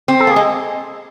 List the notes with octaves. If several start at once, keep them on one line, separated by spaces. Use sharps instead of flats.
C4
A4
A#3 G#4
G#3